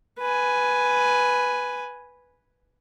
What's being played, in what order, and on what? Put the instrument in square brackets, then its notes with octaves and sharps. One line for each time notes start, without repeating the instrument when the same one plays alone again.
[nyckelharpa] B4 G#5